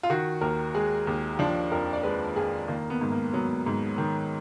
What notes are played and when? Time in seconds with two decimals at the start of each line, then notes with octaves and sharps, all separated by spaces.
0.03 F4
0.10 D#3 F#4
0.41 D#2 A#4
0.74 G#3 G#4
1.07 D#2
1.39 F3 D4
1.71 F2 A#4
1.93 D5
2.03 G#3 B4
2.36 F2 G#4
2.68 D#3 A#3
2.90 B3
3.01 G#2
3.12 A#3
3.33 F#3 B3
3.66 G#2
3.98 D#3